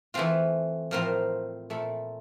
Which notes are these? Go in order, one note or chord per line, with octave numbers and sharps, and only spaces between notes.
E3 A3 C4 F4
A2 F3 C4 F4 A#4
A#2 A3 E4 A4